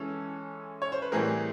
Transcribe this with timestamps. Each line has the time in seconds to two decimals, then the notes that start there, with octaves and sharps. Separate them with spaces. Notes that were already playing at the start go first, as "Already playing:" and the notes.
Already playing: E3 G#3 C#4 A4
0.82 C#5
0.92 C5
1.02 B4
1.12 A2 E3 G3 C4 G#4 A#4